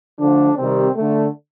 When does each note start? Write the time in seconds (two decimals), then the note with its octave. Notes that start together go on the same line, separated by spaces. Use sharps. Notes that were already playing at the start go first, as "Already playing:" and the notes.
0.19 D3 F3 A3 D4
0.57 C3 D#3 G3 C4
0.95 D3 A3